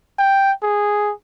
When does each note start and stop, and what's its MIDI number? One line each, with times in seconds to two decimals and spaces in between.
0.19 0.52 79
0.63 1.13 68